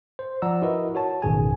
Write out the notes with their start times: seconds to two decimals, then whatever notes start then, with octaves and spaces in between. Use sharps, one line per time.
0.19 C5
0.42 F3 D5 F#5 A#5 E6
0.62 E4 F#4 A#4 B4 D#5
0.95 F#4 C#5 A5
1.22 A1 F#2 B2 D#3 G#4 G#5